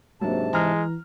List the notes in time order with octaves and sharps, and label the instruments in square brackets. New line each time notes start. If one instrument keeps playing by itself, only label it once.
[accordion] G#2 C3 A5 [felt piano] F#3 A#3 D4
[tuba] E3 [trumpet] G#3 [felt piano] A#5 F6